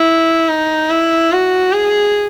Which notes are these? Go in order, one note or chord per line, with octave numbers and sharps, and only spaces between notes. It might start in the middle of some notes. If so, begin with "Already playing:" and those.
Already playing: E4
D#4
E4
F#4
G#4